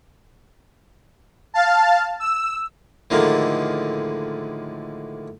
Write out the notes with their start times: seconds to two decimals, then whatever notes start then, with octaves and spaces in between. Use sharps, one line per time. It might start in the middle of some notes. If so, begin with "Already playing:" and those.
1.54 F5 A5
2.20 E6
3.10 A2 D3 D#3 F3 G#3 A#3